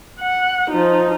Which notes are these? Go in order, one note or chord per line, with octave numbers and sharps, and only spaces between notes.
F#5
F3 D#4